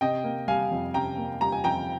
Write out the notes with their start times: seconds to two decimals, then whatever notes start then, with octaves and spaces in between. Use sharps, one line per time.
0.01 C3 D#5 G5
0.24 A#3
0.48 G3 F5 G#5
0.71 F2
0.94 C3 G5 A#5
1.18 A#3
1.41 G3 A#5
1.52 G#5
1.64 F2 G5 A#5